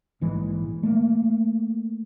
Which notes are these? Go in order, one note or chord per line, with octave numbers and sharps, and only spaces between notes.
A#1 G#2 E3 G#3
A3 A#3